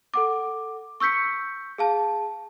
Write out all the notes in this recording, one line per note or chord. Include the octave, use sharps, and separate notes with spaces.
A4 F#5 D6
C#6 E6 G6 B6 C#7
G#4 F5 A5